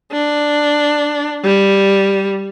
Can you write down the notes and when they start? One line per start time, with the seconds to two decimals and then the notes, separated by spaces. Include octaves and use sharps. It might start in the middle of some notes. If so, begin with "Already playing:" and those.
0.12 D4
1.44 G3